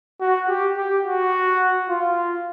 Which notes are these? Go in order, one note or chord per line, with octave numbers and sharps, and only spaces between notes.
F#4
G4
G4
F#4
F4